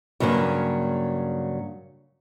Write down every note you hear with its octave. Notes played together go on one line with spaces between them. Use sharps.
G2 C#3 F#3 A#3 C#4